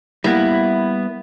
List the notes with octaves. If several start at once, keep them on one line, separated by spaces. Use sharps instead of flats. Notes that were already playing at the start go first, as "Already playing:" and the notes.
G3 A#3 B3 E4